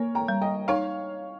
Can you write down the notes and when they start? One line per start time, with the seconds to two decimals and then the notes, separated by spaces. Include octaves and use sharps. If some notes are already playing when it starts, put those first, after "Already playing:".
Already playing: A#3 A#4 C#5
0.15 G5 A#5
0.28 G3
0.41 D#5 G5
0.68 D#4 C#5 F5